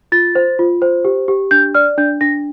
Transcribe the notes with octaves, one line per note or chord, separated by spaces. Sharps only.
F4 A6
C5
F4
C5
G4
G4
D4 G6
D5 F6
D4 G6
D4 A#6